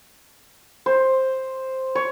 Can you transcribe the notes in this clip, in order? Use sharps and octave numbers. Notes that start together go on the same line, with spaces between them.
C5
C#5